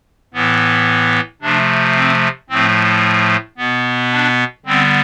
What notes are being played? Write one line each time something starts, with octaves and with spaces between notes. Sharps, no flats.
A2 E3 B3
C3 F3 A3 D4
C4
A2 F3 A3 C4
B2 B3
D4
D3 G3 B3 C4